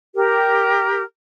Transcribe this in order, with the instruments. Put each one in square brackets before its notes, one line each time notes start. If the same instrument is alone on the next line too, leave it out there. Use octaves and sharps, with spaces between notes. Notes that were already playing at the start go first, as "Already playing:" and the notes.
[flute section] G4 A#4